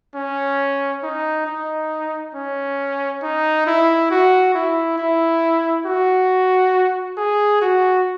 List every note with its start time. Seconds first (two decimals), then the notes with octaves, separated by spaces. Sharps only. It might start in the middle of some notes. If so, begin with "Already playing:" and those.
0.15 C#4
1.03 D#4
1.47 D#4
2.35 C#4
3.23 D#4
3.67 E4
4.11 F#4
4.55 E4
4.98 E4
5.86 F#4
7.17 G#4
7.61 F#4